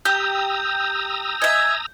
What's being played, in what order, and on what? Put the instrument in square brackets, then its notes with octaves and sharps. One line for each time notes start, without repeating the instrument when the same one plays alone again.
[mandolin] G4 [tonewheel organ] A#5 D#6 E6 [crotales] G6
[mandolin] D#5 E5 [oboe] G#5